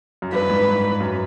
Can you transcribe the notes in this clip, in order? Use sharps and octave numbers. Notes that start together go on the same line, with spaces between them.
F#2
G2 B4
G#2
F#2